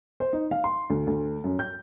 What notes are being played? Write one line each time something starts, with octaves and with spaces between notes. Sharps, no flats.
C5
D#4
F5
C6
D2
D2
F#2
G6